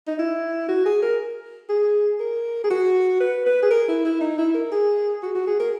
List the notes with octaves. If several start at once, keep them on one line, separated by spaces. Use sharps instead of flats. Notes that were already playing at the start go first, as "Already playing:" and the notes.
D#4
E4
F#4
G#4
A#4
G#4
A#4
G#4
F#4
B4
B4
G#4
A#4
E4
E4
D#4
E4
A#4
G#4
F#4
F#4
G#4
A#4